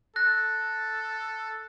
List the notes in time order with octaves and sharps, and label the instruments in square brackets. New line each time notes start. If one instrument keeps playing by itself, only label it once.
[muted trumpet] A4 [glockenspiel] F#6 A#6